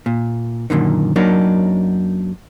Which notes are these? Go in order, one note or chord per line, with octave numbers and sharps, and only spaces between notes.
A#2
F#2 A#2 D3 D#3
F#2 F#3 A#3 D4 D#4